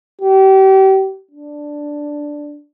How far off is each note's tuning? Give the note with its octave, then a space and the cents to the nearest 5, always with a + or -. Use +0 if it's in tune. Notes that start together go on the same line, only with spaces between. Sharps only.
G4 -35
D4 +0